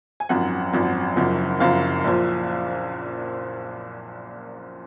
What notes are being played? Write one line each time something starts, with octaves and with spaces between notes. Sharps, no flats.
G#5
G#1 F#2 F3 F#5
G#1 F#2 F3
F#1 F#2 F3
F#1 F#2 F3 F5
A#1 A#2 F3